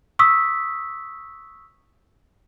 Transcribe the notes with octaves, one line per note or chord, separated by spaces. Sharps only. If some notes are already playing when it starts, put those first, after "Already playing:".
C#6 D#6 E6 B6